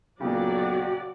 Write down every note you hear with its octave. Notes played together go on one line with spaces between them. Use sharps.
B1 A#2 C#3 F#3 F#4 G4 D5